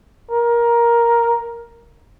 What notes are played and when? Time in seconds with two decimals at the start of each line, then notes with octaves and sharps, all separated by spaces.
0.31 A#4